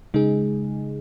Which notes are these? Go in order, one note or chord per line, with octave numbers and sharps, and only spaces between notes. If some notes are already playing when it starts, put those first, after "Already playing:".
C#3 G#3 D#4 G#4